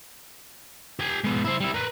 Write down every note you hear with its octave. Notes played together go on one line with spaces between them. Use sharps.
G4 G#5
G#3 B3
E4 C5
G3 E4
A#4 B4